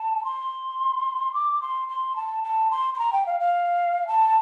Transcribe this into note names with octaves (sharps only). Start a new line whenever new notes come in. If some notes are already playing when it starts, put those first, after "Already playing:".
Already playing: A5
C6
D6
C6
C6
A5
A5
C6
C6
A#5
G5
F5
F5
A5